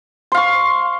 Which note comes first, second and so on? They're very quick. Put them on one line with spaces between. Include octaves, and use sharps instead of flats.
C6 F5 C#6